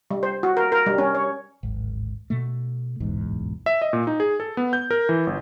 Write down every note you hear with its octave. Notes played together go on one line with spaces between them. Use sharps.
G3
C5
F#4
A#4
A#4
G3
C#4
C#5
D1 G#1
B2 A3
D1 B1 E2 G#2
E5
D#5
A#2
D#4
G#4
A4
B3
G6
A#4
E3
G1